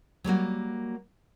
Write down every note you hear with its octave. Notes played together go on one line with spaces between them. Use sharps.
F#3 G3 A#3 F#4